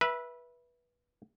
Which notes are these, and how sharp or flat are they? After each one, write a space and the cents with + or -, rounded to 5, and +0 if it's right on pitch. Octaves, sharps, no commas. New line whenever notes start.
B4 -20 E5 +0